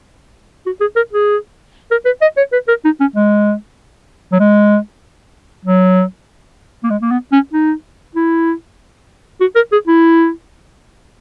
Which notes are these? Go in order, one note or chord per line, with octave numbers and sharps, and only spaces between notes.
F#4
G#4
A#4
G#4
A#4
B4
D#5
C#5
B4
A#4
D#4
C#4
G#3
F#3
G#3
F#3
A#3
G#3
A#3
B3
C#4
D#4
E4
F#4
A#4
G#4
E4